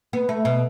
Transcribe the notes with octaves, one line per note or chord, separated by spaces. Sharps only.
B3
A3
B2